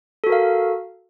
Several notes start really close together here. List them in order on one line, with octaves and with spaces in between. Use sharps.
A4 F#4 A#4 F5